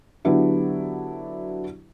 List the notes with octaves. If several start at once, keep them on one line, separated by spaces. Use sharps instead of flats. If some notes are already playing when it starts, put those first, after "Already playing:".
D3 F#3 B3 D4 E4 G4